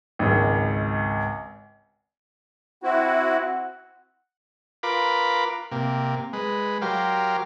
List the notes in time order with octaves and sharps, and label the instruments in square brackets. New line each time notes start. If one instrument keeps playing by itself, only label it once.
[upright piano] G#1 C#2
[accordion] C4 E4 F#4 [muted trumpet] F#5
[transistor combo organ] F4 A#4 B4 B5 D6
C3 A#3
G#3 B4
F#3 G4 A#4 C5 F5